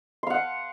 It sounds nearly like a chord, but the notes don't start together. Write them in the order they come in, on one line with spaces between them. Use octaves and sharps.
C6 F5 F#5